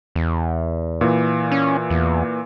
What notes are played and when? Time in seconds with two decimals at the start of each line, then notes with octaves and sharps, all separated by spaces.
0.15 E2
1.01 A#2 E3
1.52 C#4
1.90 E2